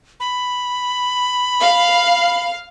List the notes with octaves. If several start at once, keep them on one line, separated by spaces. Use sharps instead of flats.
B5
F5